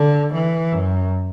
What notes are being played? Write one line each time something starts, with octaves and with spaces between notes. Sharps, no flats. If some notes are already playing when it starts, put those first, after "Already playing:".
Already playing: D3
E3
F#2